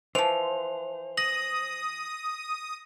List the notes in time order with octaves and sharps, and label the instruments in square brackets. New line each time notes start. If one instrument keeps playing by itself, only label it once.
[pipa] E3 F3 [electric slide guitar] C5 [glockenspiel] F7
[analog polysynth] D#6 [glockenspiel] A#6 F#7